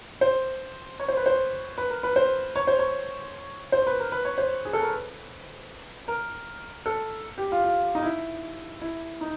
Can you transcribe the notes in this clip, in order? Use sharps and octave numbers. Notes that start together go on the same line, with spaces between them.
C5
C#5
C5
B4
C5
B4
A#4
B4
C5
C#5
C5
C#5
C5
B4
A#4
B4
C#5
C5
G#4
A4
A#4
B4
A#4
A4
G4
F4
F4
D#4
E4
E4
D#4